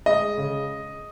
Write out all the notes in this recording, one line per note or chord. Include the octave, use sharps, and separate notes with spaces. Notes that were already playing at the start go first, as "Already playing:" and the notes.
G#3 D#5
C#3